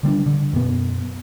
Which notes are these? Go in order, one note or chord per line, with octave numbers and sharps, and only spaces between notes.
D3 G3 B3 D4
D3
F#2 B2 B3